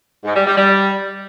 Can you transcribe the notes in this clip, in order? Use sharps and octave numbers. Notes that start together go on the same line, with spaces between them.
G#2
G3
G3
G3